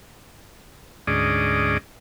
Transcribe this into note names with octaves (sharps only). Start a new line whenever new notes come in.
D2 G#2 C#4 G#4 D5 D#5